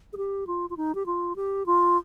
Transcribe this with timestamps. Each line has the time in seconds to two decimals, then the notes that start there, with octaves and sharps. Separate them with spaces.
0.13 G#4
0.17 G4
0.47 F4
0.70 F4
0.77 D#4
0.95 G4
1.06 F4
1.36 G4
1.66 F4